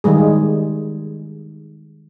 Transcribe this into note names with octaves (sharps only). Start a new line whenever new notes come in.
D#3 G3 G#3 G#4